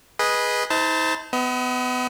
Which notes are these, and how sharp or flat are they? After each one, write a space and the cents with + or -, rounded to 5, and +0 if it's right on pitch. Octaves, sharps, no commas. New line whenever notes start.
G#4 -5 B4 -15 D#5 +0
D#4 +45 C5 -20 A5 +10
B3 +25 D#5 +40